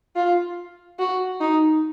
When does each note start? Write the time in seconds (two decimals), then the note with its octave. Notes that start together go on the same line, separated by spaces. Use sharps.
0.16 F4
0.99 F#4
1.40 D#4